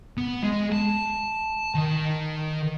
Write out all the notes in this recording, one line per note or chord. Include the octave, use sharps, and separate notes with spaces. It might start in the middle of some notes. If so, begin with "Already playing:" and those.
B3
G#3
A5
D#3